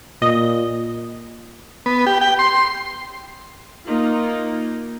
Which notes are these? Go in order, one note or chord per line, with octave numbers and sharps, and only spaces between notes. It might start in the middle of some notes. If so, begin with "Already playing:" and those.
A#2 D#5
B3
G4
G5
C6
A#3 D#4 F4